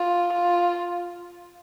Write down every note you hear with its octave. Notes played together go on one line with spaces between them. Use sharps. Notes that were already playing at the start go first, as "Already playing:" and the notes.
Already playing: F4
F4